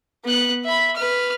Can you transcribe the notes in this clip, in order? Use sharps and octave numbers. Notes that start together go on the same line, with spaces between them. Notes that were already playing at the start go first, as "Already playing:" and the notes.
B3 F#6
E5 B5
B4 F6